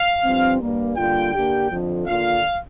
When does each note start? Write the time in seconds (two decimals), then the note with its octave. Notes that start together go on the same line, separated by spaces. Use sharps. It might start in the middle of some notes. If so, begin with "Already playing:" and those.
Already playing: F5
0.24 G2 F3 C4
0.61 G2 G3 A#3
0.97 D3 G3 A#3 F4 G5
1.34 D3 A#3 D4 G4
1.70 F2 D3 F3
2.07 D3 A#3 D4 F4 F5